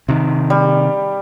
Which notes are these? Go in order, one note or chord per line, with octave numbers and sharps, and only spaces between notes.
C3 D#3
G3